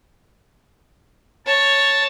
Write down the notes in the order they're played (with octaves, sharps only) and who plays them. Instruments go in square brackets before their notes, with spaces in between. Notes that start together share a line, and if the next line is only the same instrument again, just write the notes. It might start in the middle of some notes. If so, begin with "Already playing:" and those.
[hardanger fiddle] C#5 [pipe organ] A5